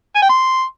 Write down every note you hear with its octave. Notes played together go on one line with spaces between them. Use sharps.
G#5
G5
C6